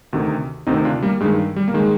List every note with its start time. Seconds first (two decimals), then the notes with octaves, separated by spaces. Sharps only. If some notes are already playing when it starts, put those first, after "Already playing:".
0.13 D2 C3 D#3
0.67 D2 C3 D#3 C4 D#4
0.85 D4 F4
1.02 G3 A#3
1.20 G2 G#3
1.24 D#3
1.56 G3
1.68 A#3
1.74 D#3 G#3